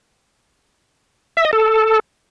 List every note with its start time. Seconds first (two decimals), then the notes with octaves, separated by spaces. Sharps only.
1.37 E5
1.45 D#5
1.53 A4